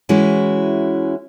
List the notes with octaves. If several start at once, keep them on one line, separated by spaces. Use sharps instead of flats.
E3 G#3 C#4 E4 F#4